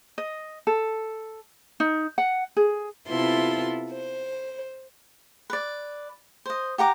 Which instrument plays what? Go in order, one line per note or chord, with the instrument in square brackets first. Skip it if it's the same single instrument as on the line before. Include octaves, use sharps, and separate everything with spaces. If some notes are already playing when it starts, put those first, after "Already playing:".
[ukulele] D#5
A4
D#4
F#5
G#4
[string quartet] C3 B3 E4 F4 A4 C6
C5
[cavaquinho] B4 D5
C5 D#5
G4 F#5 A#5 D6